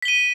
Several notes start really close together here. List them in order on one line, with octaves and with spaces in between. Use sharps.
B6 G7 D#7